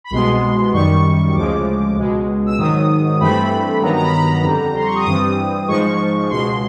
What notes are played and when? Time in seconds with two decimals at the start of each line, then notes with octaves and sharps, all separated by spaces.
0.04 B5
0.10 C2 B2 G#3 B3 C6
0.73 F#2 D#3 G3 C#6
1.34 D2 C#3 F3 G#3 D6
1.97 C#2 B2 G#3
2.46 E6
2.58 G#2 D#3 F#3 D#6
3.20 G2 E3 A3 C4 B5
3.82 G2 D#3 F#3 B3 A#5
3.92 A#5
4.03 B5
4.13 A#5
4.44 F2 D3 G3
4.75 C6
4.85 C#6
4.96 D#6
5.06 G2 E3 G3 C4 D#6
5.68 G#2 F3 G#3 C#6
6.30 C#2 B2 G#3 C6